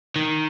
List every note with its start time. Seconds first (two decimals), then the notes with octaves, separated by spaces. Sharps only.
0.16 D#3